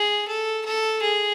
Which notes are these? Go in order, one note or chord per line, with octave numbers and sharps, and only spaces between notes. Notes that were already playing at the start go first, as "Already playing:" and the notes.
Already playing: G#4
A4
A4
G#4